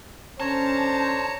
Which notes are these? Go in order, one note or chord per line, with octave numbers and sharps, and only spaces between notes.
D3 C#4 C5 C#5 A5 A#5